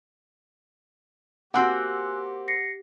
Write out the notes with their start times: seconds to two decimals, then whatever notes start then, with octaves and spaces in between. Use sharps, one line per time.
1.54 A#3 C4 F#4 G4 F#5 G#5 E6 F#6
2.48 A#6 C7 C#7